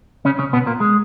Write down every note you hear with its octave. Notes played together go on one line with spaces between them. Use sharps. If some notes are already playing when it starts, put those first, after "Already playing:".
C#3 C#4
C#3 C#4
B2 B3
A#2 A#3
G#3